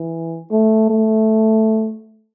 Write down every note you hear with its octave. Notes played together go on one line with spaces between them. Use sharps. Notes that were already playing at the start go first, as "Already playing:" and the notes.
Already playing: E3
A3
A3